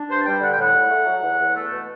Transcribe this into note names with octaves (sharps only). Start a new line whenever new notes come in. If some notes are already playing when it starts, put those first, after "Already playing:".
Already playing: D4
G2 C5
A5
G3 G5
D3 F#5
G5
A2 F#5
A2
A3
F#3
E2
E2
A3
B2